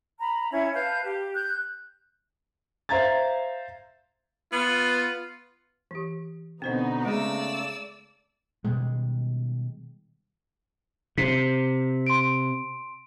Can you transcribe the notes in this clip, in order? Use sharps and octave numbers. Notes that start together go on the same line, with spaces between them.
A#5 B5
C#4 E4 E5 G#6
B4 F5 A5 G6
G4
F#6 G6
C5 E5 F5 A#5 G#6 A6
B3 F4
E3 G4
B2 D3 B3 C4 D#4 F#4 C5 D#5
C#3 G#3 A3 G#4 D5 E6
B2 D#3 G3 G#3
C3 B6
C6 D7